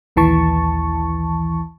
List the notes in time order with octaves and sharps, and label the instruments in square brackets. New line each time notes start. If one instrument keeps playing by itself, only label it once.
[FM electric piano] A#1 D#2 E3 A5 C#6